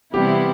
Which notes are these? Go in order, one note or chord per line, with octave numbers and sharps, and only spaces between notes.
C3 E3 G3 B3 E4 G4